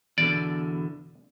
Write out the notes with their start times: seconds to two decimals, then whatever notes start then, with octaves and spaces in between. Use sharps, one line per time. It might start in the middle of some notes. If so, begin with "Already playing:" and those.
0.18 E2 B2 D3 D5